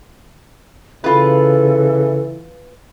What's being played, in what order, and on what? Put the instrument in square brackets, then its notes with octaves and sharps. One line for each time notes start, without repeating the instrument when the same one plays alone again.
[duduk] C#3 [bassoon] E3 [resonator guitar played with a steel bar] F4 B4 [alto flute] A4